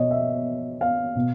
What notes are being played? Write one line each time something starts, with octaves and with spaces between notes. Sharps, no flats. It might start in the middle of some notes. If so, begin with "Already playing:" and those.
Already playing: B2 C#5 D#5
E5
F5
B2